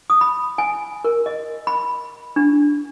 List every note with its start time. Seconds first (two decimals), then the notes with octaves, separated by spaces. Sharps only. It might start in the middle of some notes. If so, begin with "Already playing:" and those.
0.10 D#6
0.21 B5
0.58 G#5
1.05 A#4
1.26 D#5
1.67 B5
2.36 D4